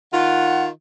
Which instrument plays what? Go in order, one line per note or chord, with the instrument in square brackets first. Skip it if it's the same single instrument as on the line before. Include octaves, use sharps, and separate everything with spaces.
[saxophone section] D#3 F4 [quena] F#5